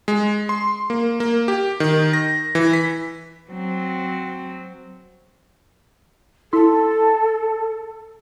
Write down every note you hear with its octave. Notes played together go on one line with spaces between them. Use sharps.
G#3
C6
A#3
A#3
G4
D#3
A#6
E3
B6
F#3 C4
E4 A4 C6